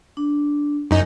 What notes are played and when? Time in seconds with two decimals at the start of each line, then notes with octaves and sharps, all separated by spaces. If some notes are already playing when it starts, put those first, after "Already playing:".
0.17 D4
0.91 F#2 D#4